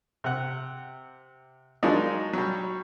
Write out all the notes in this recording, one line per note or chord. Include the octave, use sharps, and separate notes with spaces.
C3 F#5
D#3 F3 F#3 G#3 D4 D#4
F#3 G3